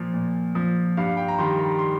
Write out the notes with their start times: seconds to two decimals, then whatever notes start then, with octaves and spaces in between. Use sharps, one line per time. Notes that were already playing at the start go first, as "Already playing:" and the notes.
Already playing: A#2 F3
0.14 A#2
0.55 F3
0.97 G2 F5
1.17 G5
1.28 A#5
1.39 D#3 G3 C6
1.59 A#5
1.79 C6